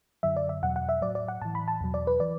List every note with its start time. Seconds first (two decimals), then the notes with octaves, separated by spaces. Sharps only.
0.23 F#2 D3 F#3 E5
0.37 D5
0.49 E5
0.62 E2 B2 F#3 F#5
0.76 F#5
0.89 E5
1.02 A2 F#3 D5
1.15 D5
1.28 F#5
1.42 A2 E3 A5
1.55 B5
1.68 A5
1.81 E2 B2 F#3
1.94 D5
2.07 B4
2.20 E3 D5